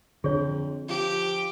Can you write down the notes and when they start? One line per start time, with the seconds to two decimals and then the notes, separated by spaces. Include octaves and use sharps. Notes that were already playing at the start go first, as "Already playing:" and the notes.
0.24 F2 D3 G#4 C#5
0.89 F3 G4